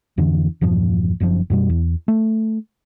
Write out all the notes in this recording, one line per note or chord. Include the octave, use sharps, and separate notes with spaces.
F2 D3 E3
E2 G2 A#2 F3
F#1 F#2 C3 F3
F#2 B2 G3
E2
A3